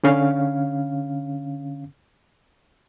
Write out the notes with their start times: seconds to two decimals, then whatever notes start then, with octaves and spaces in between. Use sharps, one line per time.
0.03 D3 C#4 F5